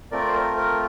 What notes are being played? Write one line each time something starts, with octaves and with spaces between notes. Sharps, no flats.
A3 C4 F4 A#4 D5
C5
A#4
A#4